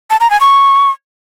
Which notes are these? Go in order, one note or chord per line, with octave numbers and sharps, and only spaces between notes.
A5
A#5
G#5
C#6